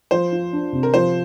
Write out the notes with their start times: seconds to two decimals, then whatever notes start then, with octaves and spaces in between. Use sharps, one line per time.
0.11 F3 C5
0.32 F4
0.53 D4
0.73 C3
0.83 A#4
0.94 F3 C5